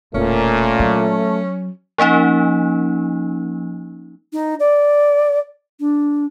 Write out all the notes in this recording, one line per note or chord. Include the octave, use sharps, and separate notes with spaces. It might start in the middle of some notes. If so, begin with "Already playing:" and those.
E1 A#2 A3 C#4
F#3
F3 A#3 C#4 D#4
D#4
D5
D4